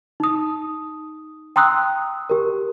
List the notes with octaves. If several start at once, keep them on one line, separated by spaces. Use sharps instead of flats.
D#4 D#6
G5 A#5 C6 D#6 E6 F#6
G4 A#4